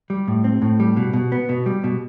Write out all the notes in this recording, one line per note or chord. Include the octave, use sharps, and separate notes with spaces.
G3
A2
C4
A2
G3
B2
B2
B3
B2
G3
B2